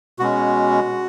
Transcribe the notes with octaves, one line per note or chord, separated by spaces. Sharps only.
B2 G#3 C#4 F#4